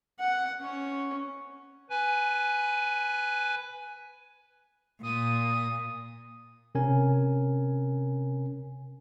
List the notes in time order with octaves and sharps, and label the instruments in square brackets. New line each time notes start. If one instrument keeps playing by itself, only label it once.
[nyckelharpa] F#5
C#4 C#5
[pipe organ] B4 G#5
[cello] A#2 [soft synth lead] D#6
[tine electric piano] C3 C#4 A#4 G#5